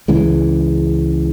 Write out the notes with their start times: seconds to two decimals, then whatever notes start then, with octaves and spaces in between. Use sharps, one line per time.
0.08 C#2 C#3 E3 G#3